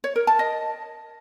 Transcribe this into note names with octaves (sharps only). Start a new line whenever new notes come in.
C#5
A#4
A5
D#5